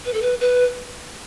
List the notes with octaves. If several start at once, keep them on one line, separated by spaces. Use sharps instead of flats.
B4
A4
B4
B4